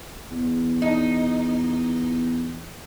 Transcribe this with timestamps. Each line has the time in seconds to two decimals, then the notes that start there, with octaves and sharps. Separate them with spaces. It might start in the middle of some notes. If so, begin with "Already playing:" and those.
0.31 E2
0.82 D#4